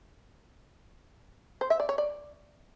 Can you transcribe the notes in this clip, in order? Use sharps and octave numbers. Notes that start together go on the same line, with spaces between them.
C5
E5
D5
C#5
D5